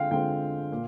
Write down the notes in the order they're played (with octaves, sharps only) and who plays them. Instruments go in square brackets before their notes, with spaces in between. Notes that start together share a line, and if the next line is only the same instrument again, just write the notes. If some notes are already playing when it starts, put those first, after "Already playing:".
Already playing: [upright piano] D3 G#3 C4 F4 [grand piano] F5 G5
[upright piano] D3 G#3 C4 F4 [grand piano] G5
[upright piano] A#2